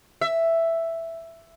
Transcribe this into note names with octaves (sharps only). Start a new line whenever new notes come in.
E5